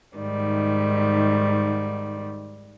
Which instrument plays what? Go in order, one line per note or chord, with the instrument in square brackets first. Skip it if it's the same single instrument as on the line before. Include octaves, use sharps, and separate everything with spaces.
[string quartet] G#2 D#3 G3